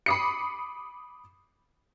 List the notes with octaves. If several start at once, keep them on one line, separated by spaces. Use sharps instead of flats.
B5 D6 D#6 C7 C#7